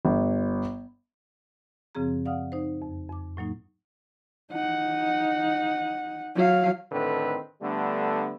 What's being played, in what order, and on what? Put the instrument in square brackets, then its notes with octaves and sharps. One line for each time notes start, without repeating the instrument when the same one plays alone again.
[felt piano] G1
[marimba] F#2 C#3 F3 C4 G#4 A#5
D5 F5 F#5 D#6 F6
D#4 C5
F2
F2 D6
A2 F#3 A#3 D#4
[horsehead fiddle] D#4 F#5
F#3 F5
[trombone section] A2 D3 D#3 C4 B4
D3 G3 A3 B3 D4